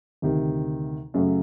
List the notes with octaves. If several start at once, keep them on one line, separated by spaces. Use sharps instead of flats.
D2 C3 D#3
F#2 C#3 F#3 A3